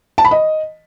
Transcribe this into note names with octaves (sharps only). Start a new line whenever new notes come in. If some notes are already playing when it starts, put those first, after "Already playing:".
A5
B5
D#5